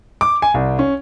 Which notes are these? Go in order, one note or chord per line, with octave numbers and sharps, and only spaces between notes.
D6
G#5
C2
C#4